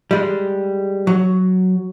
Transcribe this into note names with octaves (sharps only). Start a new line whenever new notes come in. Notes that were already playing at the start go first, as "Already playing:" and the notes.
G3 G#3
F#3